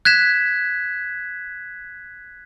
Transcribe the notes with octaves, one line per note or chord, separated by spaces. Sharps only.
F#6 G#6 B6 E7